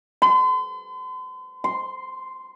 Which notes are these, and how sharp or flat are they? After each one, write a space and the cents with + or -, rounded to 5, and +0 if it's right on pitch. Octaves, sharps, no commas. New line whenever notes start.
C6 -45
C6 -5